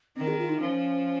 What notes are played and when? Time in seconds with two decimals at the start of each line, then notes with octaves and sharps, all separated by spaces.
0.16 D#3 C4
0.28 G#4
0.39 F4
0.49 D#4
0.60 F3 C#4